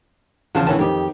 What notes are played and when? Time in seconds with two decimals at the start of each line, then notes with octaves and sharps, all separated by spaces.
0.55 E2 C#3 F3 A5
0.67 D#2 D3 E3 C#4 A5
0.79 F2 D#3 G4